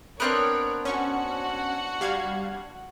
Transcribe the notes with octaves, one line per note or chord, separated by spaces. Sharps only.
B3 C4 D4 A#4 C#5 F6 F#6 D7
C#4 F#4 F#5 C#6
G3 F5 G#6